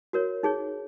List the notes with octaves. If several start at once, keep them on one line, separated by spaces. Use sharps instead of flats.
F#4 A#4 C#5
D#4 G#4 C#5